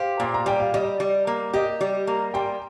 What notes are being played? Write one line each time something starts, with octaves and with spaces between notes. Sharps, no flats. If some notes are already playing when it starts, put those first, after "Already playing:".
Already playing: G4 C5 F5
A#2 C6
A#5
G3 G5
F5
G3 D#5
G3
A#3
G4 D#5
G3
A#3
G3 G5 C6